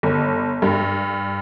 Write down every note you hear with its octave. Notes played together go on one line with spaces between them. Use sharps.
G1
G2